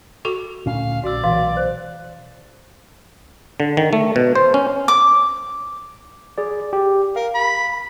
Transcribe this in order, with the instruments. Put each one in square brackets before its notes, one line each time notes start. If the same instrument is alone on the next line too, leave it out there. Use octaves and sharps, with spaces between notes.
[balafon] F#4 A4 C#6
[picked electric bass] D2 A#2 C#4 [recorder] F5
[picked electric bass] A#1 [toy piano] F#4 E6 [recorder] D5
[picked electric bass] B1 [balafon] E3 [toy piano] F5
[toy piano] C5
[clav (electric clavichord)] D3
D#3
A3
B2
C5
C#4
[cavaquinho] D6
[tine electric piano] G#4 D5
G4
[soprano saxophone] A#4 [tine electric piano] F5
[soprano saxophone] B5